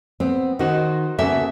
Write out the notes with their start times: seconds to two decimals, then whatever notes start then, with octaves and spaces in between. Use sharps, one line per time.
0.20 B3 C4
0.59 D#3 D#4 F#4 C5
1.18 C#3 A#3 B3 F#4 A4 E5